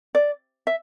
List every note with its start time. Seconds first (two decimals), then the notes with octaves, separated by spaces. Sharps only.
0.15 D5
0.67 E5